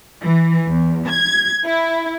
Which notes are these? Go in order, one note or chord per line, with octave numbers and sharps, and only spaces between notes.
E3
E2
G#6
E4